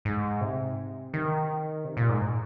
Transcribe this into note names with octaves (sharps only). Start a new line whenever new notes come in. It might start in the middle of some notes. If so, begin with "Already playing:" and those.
G#2
C3
D#3
C3
A#2
G#2